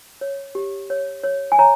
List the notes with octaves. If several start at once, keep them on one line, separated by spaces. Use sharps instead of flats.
C#5
G4
C#5
C#5
G#5
C#5 A#5